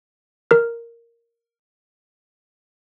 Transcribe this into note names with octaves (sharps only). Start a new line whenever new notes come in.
A#4 F6